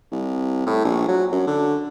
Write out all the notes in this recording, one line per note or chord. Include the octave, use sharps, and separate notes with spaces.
C2
A2
A#1
F#3
F#2
D3